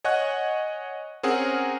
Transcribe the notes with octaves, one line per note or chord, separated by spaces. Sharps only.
C#5 D#5 F#5 G#5 C#6 F#6
C4 C#4 G#4 A#4 F#5